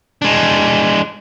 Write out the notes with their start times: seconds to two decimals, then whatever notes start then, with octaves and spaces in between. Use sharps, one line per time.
0.22 G#3 D4